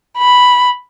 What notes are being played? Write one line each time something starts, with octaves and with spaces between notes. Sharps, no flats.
B5